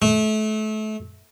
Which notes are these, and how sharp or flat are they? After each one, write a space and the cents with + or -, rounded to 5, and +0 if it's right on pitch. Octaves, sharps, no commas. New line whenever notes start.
A3 -30